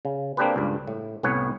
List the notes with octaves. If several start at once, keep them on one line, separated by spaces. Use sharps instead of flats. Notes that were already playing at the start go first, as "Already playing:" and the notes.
C#3
A#3 C4 D4 G4 G#4 B4
C#2 G2
A2
C2 A2 B3 C#4 C#5 F#5